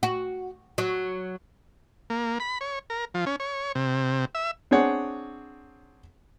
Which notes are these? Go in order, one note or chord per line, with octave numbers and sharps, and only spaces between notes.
F#4
F#3
A#3
B5
C#5
A#4
F3
C#4
C#5
C3
E5
C4 D4 G#4 C#5 F#5